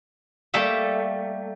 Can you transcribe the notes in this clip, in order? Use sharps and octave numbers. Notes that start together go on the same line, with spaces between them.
G3 A3 A#3 E5